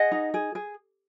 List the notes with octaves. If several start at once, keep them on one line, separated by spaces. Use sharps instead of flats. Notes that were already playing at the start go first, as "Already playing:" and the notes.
Already playing: G#4 D#5 F#5
D#4
G#4
G#4